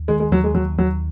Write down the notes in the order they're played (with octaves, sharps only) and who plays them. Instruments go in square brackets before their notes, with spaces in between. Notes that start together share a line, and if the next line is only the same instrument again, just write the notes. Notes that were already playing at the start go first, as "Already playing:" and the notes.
Already playing: [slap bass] D#2
[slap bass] D#3 [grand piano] G#3
[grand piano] G#3
[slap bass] D#2 [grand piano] F#3
[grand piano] G#3
[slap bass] D#2 [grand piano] F#3
[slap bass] D#2 [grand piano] F#3